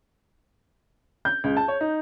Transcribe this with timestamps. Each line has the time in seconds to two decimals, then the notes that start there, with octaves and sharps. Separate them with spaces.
1.25 G6
1.44 C#2
1.57 A5
1.68 C#5
1.81 D#4